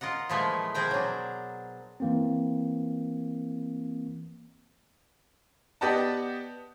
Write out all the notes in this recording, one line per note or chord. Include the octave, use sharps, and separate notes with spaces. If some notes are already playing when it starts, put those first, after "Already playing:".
F4 A#4 D#5 F#5
A#2 E3 F3 G#3 A3
B2 G#4 A#4 C5 G5
F#3 D4
E3 A#3 C4
B3 G4 D5 D#5 F#5 A5